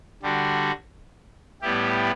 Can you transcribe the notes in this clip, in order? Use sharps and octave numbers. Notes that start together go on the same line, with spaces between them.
D3 G3 D4 F#4
A2 G3 B3 E4 G4